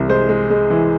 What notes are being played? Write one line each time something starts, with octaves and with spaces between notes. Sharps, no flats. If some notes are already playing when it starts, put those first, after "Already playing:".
Already playing: C2 C3 E3
G#3 C5
G#3
G#3
E3